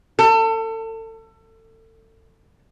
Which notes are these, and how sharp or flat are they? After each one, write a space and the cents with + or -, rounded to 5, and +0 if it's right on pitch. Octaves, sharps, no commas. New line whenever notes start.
A4 +30